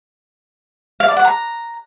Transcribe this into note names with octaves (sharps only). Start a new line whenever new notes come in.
F5
D5
F#5
A#5